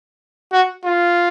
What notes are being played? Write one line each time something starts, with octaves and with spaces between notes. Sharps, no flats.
F#4
F4